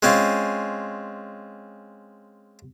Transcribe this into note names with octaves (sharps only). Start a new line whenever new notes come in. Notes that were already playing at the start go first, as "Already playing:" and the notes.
G#3 C4 C#4 F4